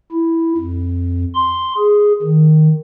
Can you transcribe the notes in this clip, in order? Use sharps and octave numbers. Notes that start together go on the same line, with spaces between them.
E4
F2
C6
G#4
D#3